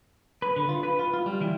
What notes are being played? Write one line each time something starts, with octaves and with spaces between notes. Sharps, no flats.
B4
D3
F4
B4
F4
F4
G3
E3